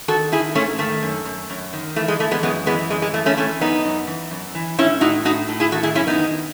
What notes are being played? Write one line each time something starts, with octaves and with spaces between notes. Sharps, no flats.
D#3 F#4 A4
D#3 E4 G#4
G#2 A3 C#4
D#3 A3
F#2
F#2
F#2
D#3
E3 A3
G#3
E3 A3
G#3 B3
F#2 G#3 B3
E3 G#3 B3
F#2 G#3
G#3
E3 A3
A3 C#4
E3 A3 C#4
F#2 B3 D#4
F#2
E3
F#2
E3
A2 C#4 E4
A2 D#4 F#4
A2 D#4 F#4
A2
E4 G#4
D#3 F#4 A4
E4 G#4
F#2 C#4 E4
B3 D#4
D#3